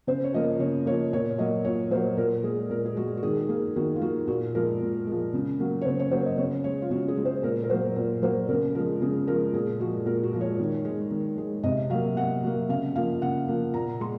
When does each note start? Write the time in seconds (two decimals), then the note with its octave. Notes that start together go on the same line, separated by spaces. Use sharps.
0.07 C#3 C5
0.24 C#5
0.33 F3 A#3 D#5
0.59 C#3 C#5
0.86 F3 A#3 C#5
1.13 A#2 C#5
1.38 F#3 A#3 D#5
1.65 A#2 C#5
1.91 A#3 C5
1.95 F#3
2.17 A#2 A#4
2.43 G#3 G#4
2.70 A#2 A#4
2.86 G#4
2.97 G#3 F#4
3.17 F#4
3.23 D#3 G#4
3.49 A#3 G#4
3.76 D#3 F#4
3.96 F4
4.02 A#3 F#4
4.28 A#2 F#4
4.55 F3 G#3 A#4
4.81 A#2
5.07 F3 G#3
5.34 C#3
5.60 F#3 A#3
5.81 C#5
5.85 C#3 C5
5.99 C#5
6.11 F#3 A#3 C5
6.26 D#5
6.38 C#3 C#5
6.64 G#3 C#5
6.82 F4
6.90 C#3 F#4
7.08 G#4
7.17 G#3
7.25 C5
7.43 A#2 A#4
7.64 A#4
7.70 F#3 A#3 C5
7.96 A#2
8.22 F#3 A#3 C5
8.49 C#3 A#4
8.75 F3 A#4
8.78 G#3
9.02 C#3 G#4
9.27 F3 G#3 A#4
9.53 A#2 G#4
9.79 F3 G#3 F#4
10.06 A#2 A#4
10.23 F#4
10.33 F3 G#3
10.41 C#5
10.59 D#3
10.85 G#3
11.11 D#3
11.38 G#3
11.63 C3 D#5
11.90 F#3 F5
11.95 A#3
12.16 C3 F#5
12.43 F#3 A#3
12.69 C#3 F5
12.96 F3 A#3 F5
13.22 C#3 F#5
13.48 F3 A#3
13.74 A#2 A#5
14.00 G#3 C6